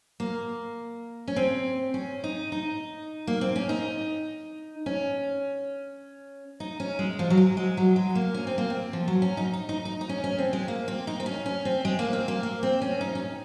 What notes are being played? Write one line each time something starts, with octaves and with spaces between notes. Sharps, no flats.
A#3
C#4
C4
C#4
D#4
D#4
A#3
C4
C#4
D#4
C#4
D#4
C#4
G#3
F3
F#3
G#3
G#3
F#3
G#3
A#3
C#4
C4
A#3
C4
F3
F#3
C#4
D#4
D#4
D#4
D#4
D#4
C#4
C#4
C4
G#3
A#3
C4
D#4
C4
C#4
C#4
C4
G#3
A#3
C4
A#3
A#3
C4
C#4
D#4
C#4